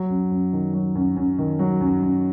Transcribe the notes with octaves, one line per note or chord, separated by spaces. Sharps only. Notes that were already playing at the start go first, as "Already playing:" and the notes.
Already playing: F#3
F#2
F#2
D#3
F#3
F#2
F#2
D#3
F#3
F#2
F#2